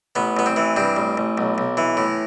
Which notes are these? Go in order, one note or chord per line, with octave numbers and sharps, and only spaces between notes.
A1 B3
A1 B3
C4
E3
G2 C4
A1
A1
B1
B1
E3
A2